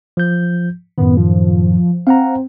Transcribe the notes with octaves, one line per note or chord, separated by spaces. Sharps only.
F3 G6
F#2 A2 D#3 B3
F3
C4 F5 F#5 A#5